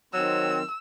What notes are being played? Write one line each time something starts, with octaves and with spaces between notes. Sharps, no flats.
D#3 F#3 C4 E6